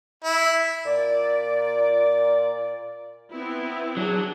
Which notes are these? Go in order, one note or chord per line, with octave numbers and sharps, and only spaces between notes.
E4
A#2 D5
B3 C4 E4
F#3 D4 G#4